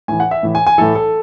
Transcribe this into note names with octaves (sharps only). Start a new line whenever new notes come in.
A2 E3 G#5
F#5
E5
A2 E3
G#5
G#5
A2 E3 A4
A4